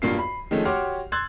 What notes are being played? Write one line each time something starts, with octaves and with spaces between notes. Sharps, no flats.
B1 G2 A#3 F4 C7
B5
D#3 F3 G#3 A3 C#4
F#4 G4 C#5 C6 D6 F6
C6 E6 F#6 G#6 A6